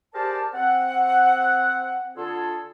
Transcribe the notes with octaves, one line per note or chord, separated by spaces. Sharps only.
G4 G#4 A#4 C5 D5 A5
C4 F#5
D3 F4 G#4 A4